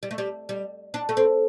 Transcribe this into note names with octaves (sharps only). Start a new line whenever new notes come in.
G3
A3
G3
G3
D4
A3
C4